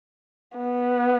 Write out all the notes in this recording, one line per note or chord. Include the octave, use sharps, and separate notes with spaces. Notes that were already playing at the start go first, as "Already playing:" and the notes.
B3